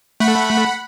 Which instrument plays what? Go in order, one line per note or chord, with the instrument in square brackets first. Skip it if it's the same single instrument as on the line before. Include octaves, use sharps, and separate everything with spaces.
[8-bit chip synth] A3 [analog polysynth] F#5 B5